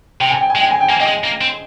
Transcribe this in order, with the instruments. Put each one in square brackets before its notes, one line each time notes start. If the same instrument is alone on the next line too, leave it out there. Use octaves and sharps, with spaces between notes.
[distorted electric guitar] C3 [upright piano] G5
[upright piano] G#5
G5
G#5
[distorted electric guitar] G#3
[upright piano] G5
G#5
G5
[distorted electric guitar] A#3 [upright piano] G#5
[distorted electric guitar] A#3 [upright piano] D#5 G5
[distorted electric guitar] G#3
A#3
C4